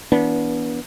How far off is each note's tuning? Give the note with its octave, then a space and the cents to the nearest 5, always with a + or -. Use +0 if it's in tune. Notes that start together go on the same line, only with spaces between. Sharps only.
E3 -5 B3 -25 D4 -35